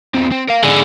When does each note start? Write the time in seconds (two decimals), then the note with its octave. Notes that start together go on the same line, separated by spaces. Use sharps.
0.14 E2 C4
0.31 C4
0.48 A#4 F5
0.63 G#2 D3 G#4 D5